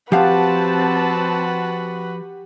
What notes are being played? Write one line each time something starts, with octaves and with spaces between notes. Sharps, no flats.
F3 C4 F#4 G4 B4 F5 F#5 A5